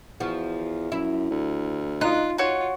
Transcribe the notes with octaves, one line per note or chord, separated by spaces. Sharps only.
E2 F3 F#4
F#2 E4
D2
D#4 F4 F#6
F4 F#4 C#5